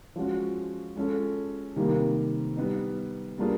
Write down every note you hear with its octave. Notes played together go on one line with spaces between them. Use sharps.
F3 G#3 C#4 F#4
G#3 C#4 F4 A4
C3 D#3 G3 A#3
G3 B3 D#4
G3 A#3 D4 F4 G#4